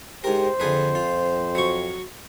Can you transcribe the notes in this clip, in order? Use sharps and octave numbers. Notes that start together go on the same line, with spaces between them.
G#2 G4 A#4 C5
F2 D3 G#4 B4
F4
F#3 C#6